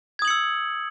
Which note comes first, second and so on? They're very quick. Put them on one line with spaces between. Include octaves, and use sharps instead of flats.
G#6 D#6 F#7 C#7 E6